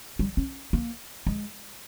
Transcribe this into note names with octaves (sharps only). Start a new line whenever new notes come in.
G3
C#4
A#3
G#3